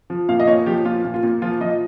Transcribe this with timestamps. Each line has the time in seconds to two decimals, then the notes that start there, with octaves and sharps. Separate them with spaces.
0.10 F3
0.29 A#2 F5
0.40 D#5
0.47 A#2 C#5
0.66 F3 G4
0.85 A#2 F4
1.04 A#2
1.14 F4
1.23 A#2
1.42 F3 F4
1.61 F3 D#5